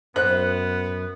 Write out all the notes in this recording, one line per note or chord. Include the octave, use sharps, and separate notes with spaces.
F#2 B3 C5 F#6